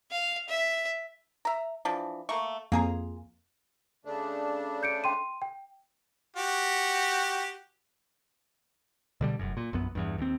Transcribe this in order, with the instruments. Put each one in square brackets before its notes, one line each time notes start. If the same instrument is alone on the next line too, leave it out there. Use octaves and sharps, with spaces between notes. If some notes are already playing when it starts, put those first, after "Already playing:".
[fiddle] F5
E5
[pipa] E5 A#5
E3 F3 D4
[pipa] A3 A#3 [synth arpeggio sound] C#6
[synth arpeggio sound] F2 A#3 [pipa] F4 G#4 A#5
[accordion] C#3 A3 D4
[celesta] G6 C#7 D7
G5 C6 D#7
G5
[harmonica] F#4 G4
[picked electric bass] B2 D3 G3
F1 F#2
A#2
A#1 F#2 B3
E2 G2
D#2 C4